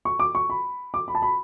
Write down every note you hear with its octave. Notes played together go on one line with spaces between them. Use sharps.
C#6
D6
C#6
B5
D6
B5
A5
B5